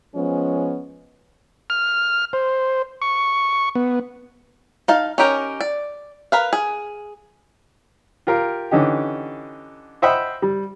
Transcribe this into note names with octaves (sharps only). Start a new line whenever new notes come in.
F3 G#3 B3 C#4
F6
C5
C#6
B3
D#4 F5 A5
C#4 D#4 G4 A#4
D5
A#4 B4 F5
G#4
F4 G4 A#4 F5 G5
D3 E3 C#4 D#4 G4
C5 D#5 E5 F#5 G5 B5
G3